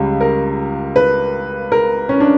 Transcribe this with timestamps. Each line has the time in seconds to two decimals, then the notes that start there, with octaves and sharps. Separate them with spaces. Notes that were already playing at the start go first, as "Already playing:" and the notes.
Already playing: C#2 C#3 G3
0.21 A#4
0.96 B4
1.72 A#4
2.09 C#4
2.20 D4